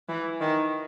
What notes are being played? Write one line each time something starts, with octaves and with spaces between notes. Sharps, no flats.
E3
D#3